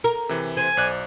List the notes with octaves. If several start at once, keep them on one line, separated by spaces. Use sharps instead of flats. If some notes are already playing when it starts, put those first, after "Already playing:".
A#4
C3 E3
C5 G#5
B1 D5 F#6